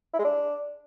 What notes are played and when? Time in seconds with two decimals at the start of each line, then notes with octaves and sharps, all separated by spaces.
0.13 E4
0.19 G#3
0.24 D4